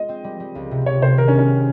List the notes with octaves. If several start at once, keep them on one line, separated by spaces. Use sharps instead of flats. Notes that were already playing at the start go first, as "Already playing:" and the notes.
Already playing: G#3 F4 D#5
C4
G3
G3
C#2
C3
C#2 C#5
C3 C5
D#3 A#4
C#4
C2
C#4